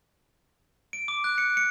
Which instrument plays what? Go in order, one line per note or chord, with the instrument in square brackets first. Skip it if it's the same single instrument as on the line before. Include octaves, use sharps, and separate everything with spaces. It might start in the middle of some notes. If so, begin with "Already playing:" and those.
[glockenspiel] D7
D6
F#6
C#7
C#7